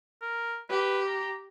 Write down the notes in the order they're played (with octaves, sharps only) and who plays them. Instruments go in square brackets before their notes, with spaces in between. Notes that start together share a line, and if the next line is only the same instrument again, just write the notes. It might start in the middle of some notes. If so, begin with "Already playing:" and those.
[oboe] A#4
[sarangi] G4 [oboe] B4
[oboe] A#5